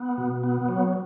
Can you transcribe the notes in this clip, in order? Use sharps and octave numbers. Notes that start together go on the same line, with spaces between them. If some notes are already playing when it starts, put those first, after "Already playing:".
Already playing: B3
B2
B3
F#3